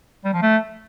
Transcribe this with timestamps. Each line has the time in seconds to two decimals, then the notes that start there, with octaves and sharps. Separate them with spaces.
0.24 G3
0.33 F3
0.42 A3